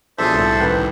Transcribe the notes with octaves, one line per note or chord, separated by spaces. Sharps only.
B1 F3 D4 G#4 A4 C5 E5
C2 A2
A1 D#3 B4